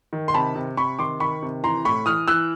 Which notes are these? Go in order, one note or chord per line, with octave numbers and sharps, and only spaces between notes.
D#3
C6
C3 A5 B5
C3
C3 B5 C#6
D#3 C6 D6
D#3 B5 C#6
C3
E3 A#5 C6
A2 B5 C#6
E3 D#6 F6
E3 E6 F#6